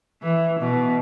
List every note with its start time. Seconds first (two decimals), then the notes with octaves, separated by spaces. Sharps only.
0.23 E3
0.60 B2